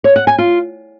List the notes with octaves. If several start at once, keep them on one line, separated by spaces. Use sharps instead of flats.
C#5
F#5
G#5
F4